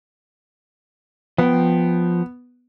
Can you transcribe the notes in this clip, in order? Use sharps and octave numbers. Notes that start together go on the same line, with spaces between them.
F3 B3 G5